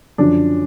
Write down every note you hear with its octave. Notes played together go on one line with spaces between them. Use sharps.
F#2 D3 F3 D4